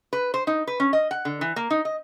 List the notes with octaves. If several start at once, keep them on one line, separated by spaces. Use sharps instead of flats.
B4
C5
D#4
B4
C#4
D#5
F#5
D3
E3
A#3
D#4
D#5